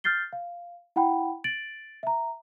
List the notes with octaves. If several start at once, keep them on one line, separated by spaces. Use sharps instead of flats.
F6 G6 A6 C7 G7
F5
E4 F#5 G5 B5
A6 D7 F#7
E5 A#5